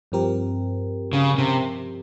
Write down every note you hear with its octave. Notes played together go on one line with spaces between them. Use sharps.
G2 F3 C4 G4 A#4
C#3
C3